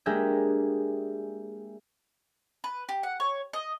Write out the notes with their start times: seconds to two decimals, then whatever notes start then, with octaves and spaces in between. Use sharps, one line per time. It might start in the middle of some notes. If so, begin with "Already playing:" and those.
0.06 G#3 A#3 D4 G4 G#4 E5
2.64 B4
2.89 G4
3.03 F#5
3.20 C#5
3.53 D#5